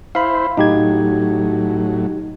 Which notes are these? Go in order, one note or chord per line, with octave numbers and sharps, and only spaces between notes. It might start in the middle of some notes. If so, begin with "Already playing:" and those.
E4 C5 F5 B5
A2 F#3 D#4 G4 G#6